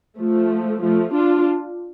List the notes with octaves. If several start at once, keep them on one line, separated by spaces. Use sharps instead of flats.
F3 A3
F3 A3
D4 F4